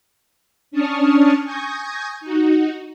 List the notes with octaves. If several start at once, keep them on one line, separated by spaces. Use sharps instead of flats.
C#4 D4 A5 C#6 D#6 F6
G#5 C#6 D#6 G6 G#6 A#6
D#4 F#4